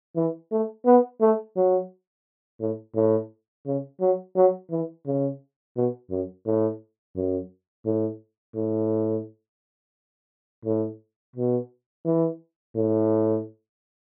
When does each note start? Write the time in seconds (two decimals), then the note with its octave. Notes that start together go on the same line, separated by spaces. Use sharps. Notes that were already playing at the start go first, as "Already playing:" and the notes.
0.16 E3
0.51 A3
0.86 B3
1.21 A3
1.56 F#3
2.60 A2
2.95 A2
3.66 C#3
4.01 F#3
4.36 F#3
4.70 E3
5.06 C#3
5.76 B2
6.11 F#2
6.46 A2
7.16 F#2
7.85 A2
8.55 A2
10.65 A2
11.36 B2
12.05 E3
12.76 A2